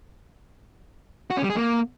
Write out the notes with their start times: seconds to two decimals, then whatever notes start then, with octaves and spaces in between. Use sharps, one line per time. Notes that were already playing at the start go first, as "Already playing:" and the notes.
1.30 F#4
1.37 C#4
1.43 G3
1.50 G#4
1.56 A#3